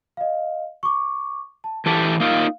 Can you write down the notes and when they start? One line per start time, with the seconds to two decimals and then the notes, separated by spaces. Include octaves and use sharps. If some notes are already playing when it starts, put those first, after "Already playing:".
0.17 D#5 F5
0.83 C#6 D6
1.64 A5
1.86 E3 G4 A4 A5 G6 B6
2.20 A#3 D#4 F4 F5